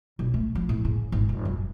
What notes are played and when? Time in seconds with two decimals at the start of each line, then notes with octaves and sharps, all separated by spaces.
0.19 B1
0.34 A3
0.55 F3
0.69 A2
0.85 C#3
1.12 G#1
1.29 F1
1.45 F#2